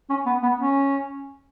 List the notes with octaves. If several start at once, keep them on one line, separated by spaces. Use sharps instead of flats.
C#4
B3
B3
C#4